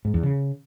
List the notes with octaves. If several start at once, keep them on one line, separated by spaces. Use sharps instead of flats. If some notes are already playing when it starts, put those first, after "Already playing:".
G#2
E2
C#3